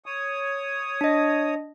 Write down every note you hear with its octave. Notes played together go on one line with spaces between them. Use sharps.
C#5 D#6
D4 D#5